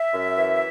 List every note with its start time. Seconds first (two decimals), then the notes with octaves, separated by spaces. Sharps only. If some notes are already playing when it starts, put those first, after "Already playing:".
Already playing: E5
0.13 F#2
0.38 E3